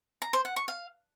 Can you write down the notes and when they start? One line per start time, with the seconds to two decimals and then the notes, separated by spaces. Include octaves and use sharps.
0.22 A#5
0.33 C5
0.45 F#5
0.56 C#6
0.68 F5